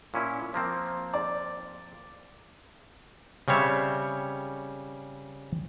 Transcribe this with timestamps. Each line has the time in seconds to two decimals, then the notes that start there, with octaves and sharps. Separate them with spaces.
0.14 A#2 C#4 E4
0.54 F3 A#3 C4
1.14 D5
3.48 C#3 G3 C4 C#5 E5